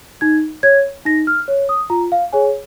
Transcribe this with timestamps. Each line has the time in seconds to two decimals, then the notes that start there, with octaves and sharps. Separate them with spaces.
0.21 D#4 G#6
0.63 C#5 G#6
1.05 D#4 A#6
1.27 F6
1.48 C#5
1.69 D#6
1.90 F4 A#5
2.12 F5
2.33 G#4 C#5 G#5